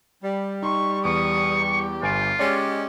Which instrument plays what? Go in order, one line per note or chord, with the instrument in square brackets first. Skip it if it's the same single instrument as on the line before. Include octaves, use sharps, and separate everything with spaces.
[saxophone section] G3
[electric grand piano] D#4 C6 [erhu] C#6
[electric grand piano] E2 [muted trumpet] C#6 [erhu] D#6
[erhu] G4
[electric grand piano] G1 G#5 D7 [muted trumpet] F4
[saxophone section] G#3 C#4 [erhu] G4 [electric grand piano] D5 G#5